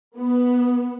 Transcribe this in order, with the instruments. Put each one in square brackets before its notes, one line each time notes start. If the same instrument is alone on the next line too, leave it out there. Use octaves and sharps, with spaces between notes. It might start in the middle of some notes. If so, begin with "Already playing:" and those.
[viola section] B3